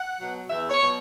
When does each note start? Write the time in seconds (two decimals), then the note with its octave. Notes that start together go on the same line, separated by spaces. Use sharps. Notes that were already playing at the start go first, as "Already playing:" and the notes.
Already playing: F#5
0.17 B2 F#3
0.49 E2 E5
0.70 C#5
0.81 B2 F#3